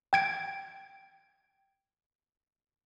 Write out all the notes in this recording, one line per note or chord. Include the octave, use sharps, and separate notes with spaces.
G5 G#6 D7